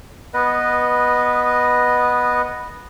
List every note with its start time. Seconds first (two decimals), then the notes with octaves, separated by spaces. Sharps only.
0.34 B3 B4 D#5